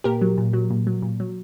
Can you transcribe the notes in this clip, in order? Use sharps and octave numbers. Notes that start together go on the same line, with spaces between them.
A#2 G4 A#4
F#3
A#2
F#3
A#2
F#3
A#2
F#3